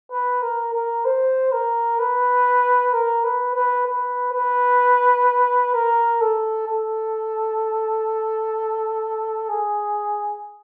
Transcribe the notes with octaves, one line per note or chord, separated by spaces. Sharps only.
B4
A#4
A#4
C5
A#4
B4
A#4
B4
B4
B4
B4
A#4
A4
A4
G#4